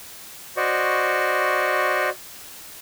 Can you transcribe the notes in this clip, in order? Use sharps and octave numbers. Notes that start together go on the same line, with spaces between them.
F#4 C5 D5 D#5 C#6